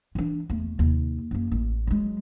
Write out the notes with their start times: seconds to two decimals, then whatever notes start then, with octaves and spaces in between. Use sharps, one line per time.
0.15 E3 D4
0.50 E2 A3
0.79 D#2 C3
1.31 F#2 A#3
1.52 A1
1.87 F#3 G#3